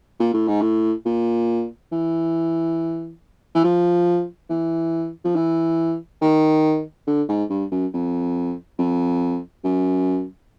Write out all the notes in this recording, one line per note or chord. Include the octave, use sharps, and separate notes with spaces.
A#2
A2
G#2
A2
A#2
E3
E3
F3
E3
F3
E3
D#3
D3
G#2
G2
F#2
F2
F2
F#2